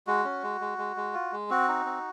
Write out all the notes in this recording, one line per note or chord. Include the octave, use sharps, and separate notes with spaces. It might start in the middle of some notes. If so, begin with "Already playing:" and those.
G#3 F#4
C#4
G#3
G#3
G#3
G#3
F4
G#3
C4 F#4
D#4
C4